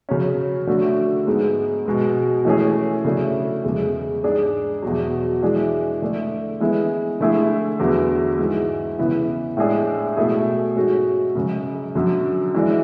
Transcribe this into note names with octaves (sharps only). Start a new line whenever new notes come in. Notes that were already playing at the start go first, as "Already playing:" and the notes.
C#3 F#3 C#4
D3 A3 D4 F#4
G#2 G#3 B3
B2 G#3 B3
E3 A3 C#4 G#4
C#3 F#3 A3 D4
E2 C#3 G#3
G#2 G#3 D4 G#4
E2 B2 F#3
E3 G#3 D4 G#4
D3 A3 D4
E3 G#3 B3 E4
D3 A3 E4 G#4
E2 D3 F#3 B3
G#2 E3 G#3
C#3 E3 B3 E4
A2 G#3 D4 G#4
B2 A3 E4 G#4
G#2 G#3 C#4 F#4
F#2 C#3 G#3
F#2 D3 F#3
E3 G#3 D4